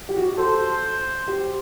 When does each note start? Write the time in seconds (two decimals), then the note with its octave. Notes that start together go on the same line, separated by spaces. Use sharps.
0.09 G4
0.16 F#4
0.27 G4
0.37 A4 C5
1.28 G4